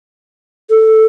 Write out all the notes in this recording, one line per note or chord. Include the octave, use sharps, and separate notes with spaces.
A4